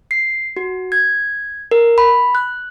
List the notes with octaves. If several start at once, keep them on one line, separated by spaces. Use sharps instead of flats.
C7
F#4
G#6
A#4
B5
F#6